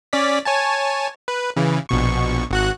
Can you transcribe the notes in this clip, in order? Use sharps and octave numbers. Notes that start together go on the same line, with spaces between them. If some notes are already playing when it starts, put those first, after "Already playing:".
C#4 D5 B6
C#5 G#5 A5
B4
C#3 E3
A#1 B2 C#6
G#1 F#4 F#6